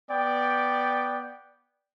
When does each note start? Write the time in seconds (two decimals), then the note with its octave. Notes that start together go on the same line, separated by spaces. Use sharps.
0.11 B3 D5 G5